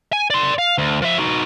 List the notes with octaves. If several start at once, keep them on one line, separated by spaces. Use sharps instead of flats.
G#5
D5 C6
F5
D2
F3 E5
D#4 F#4